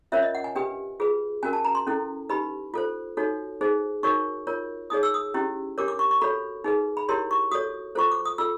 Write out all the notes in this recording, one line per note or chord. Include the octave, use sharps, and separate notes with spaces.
C#4 F4 A#4 C#5 E5
D#5
F#5
G#5
D4 G4 B4 G5
F4 G#4 B4
C#4 F#4 A#4 G#5
A5
A#5
C6
C#4 E4 A4
D#4 G4 B4 B5
F4 A4 C5
D#4 F#4 A4 C#5
D#4 G#4 C5
D#4 F#4 A#4 C#5 C#6
F4 A#4 C#5
D#4 G#4 C#5 D#6
E6
D#6
C#4 E4 G4
D4 G4 A#4 C#5 D6
D6
C#6
C#6
F#4 A4 C#5 B5
D#4 G#4 B4
B5
E4 G4 A#4 C#5 C6
C#6
F#4 A4 C#5 D#6
F4 A4 C5 C#6
D6
D#6
F4 A4 E6